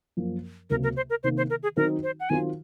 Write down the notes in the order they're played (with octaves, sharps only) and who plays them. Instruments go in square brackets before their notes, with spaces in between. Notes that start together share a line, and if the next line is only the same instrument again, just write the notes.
[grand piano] F#2 F3 A#3
[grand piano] C#2 C3 F#3 A#3 [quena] A#4
[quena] A#4
C5
A#4
[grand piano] C3 D#3 A#3 [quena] C5
[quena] C5
A#4
G#4
[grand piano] D#3 F#3 C4 D#4 F#4 [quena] A#4
[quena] C5
F#5
[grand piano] D#3 F#3 C4 F4 [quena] G#5